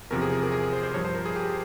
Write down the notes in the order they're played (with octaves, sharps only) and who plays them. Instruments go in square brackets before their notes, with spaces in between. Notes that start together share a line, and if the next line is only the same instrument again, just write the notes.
[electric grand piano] E2 C3 F3 A#4
G#4
A#4
A#4
G#4
C5
C5
G2 F3 C#5
C5
A#4
G#4
G4